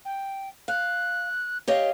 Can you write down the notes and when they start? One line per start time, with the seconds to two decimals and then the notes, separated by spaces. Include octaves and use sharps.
0.05 G5
0.68 F5 F#6
1.68 G4 C#5 D#5 F5